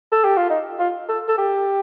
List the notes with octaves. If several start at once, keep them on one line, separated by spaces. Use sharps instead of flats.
A4
G4
F4
D#4
F4
A4
A4
G4